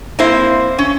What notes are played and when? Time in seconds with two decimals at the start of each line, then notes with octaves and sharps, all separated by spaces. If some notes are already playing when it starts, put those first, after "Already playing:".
0.19 A#3 C4 E4 C5
0.79 C#4